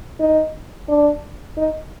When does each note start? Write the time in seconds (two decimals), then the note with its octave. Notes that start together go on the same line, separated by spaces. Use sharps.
0.20 D#4
0.89 D4
1.58 D#4